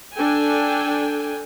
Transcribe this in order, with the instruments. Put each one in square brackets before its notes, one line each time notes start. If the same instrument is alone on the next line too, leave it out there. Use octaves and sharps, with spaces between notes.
[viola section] D4 A4 G5 G#5